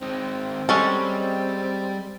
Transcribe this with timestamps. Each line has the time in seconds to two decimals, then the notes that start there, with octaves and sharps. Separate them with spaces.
0.01 D#3 G#3 C4
0.69 G3 G#3 C#4 A4